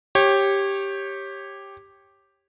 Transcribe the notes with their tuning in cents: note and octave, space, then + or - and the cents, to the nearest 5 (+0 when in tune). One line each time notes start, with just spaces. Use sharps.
G4 +0 C#5 -20